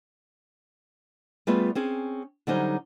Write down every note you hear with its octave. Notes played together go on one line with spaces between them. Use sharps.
G3 A3 B3 F4 G#4 E5
C4 C#4 G#4
D3 F#3 G3 C#4 D#4 C5